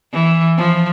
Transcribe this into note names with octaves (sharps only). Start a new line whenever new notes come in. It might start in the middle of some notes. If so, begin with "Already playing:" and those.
E3
F3